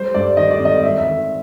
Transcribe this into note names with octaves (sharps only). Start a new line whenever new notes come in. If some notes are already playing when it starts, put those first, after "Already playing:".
Already playing: G3 C5
G2 D5
D#3 D#5
D5
G#1
D#5
D#3 E5
E5
D#3